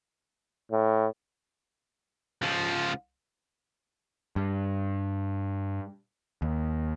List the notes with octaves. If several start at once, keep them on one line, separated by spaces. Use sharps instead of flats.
A2
C#2 F3
G2
D#2